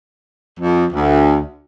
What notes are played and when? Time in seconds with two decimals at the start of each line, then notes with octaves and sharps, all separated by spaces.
0.59 F2
0.92 D2